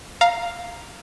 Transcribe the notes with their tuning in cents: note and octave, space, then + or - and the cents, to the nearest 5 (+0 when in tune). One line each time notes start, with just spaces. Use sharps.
F5 +0 A#5 +0